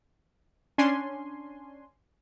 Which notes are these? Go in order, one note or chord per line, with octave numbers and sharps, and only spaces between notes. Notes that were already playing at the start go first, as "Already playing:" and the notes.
C#4 D4 G#5 C6